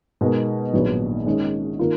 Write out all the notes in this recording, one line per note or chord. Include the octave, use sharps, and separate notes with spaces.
B2 G#3 D#4 A#4
A#1 G#2 D#3 F#3 B3
D#3 G#3 C#4
D#3 A#3 F4